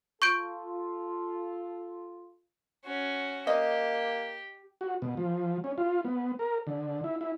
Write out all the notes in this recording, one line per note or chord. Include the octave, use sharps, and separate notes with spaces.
F4 A4 C#6 G6 D7
C#4 F#4
A#3 G4 D#5
F#4
B2
F3
C#4
F4
B3
A#4
D3
E4
E4